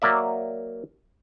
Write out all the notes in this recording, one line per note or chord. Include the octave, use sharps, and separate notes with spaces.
F#3 A#3 D5 E5